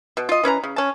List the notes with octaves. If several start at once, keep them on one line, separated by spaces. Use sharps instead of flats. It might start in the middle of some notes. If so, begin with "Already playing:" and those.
B2
F4 D#5
E3 C#4 B4 A#5
C#3
C#4 A5